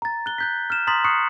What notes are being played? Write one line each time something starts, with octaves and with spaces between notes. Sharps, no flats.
A#5 A6
F#6 G7
F#6 G6 B6
F6 E7
A#5 C6 D#6 A6 B6 F#7
C#6 D#6 F#6 C7 C#7